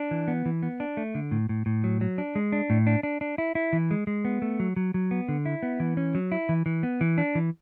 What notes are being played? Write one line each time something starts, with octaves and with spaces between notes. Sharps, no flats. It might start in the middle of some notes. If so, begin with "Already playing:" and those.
Already playing: D4
E3
B3
E3
B3
D4
A3
D3
A2
A2
A2
F#3
F#3
D4
G#3
D4
A2
D4
D4
D4
E4
E4
E3
G#3
G#3
B3
A3
F#3
F#3
F#3
B3
D3
E4
B3
E3
C#4
F#3
E4
E3
E3
B3
E3
D4
E3